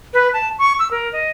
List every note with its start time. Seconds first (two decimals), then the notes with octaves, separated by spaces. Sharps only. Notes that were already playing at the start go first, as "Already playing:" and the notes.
0.14 B4
0.33 A5
0.59 C#6
0.79 E6
0.91 A#4
1.13 D#5